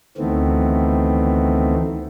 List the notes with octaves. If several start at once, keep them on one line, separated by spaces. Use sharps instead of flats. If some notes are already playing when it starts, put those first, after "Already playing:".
D2 D#3 E3 A3 B3 C4